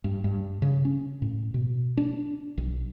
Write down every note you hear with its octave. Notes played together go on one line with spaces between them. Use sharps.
G2
G2
C#3
C#4
A2
B2
D4
B1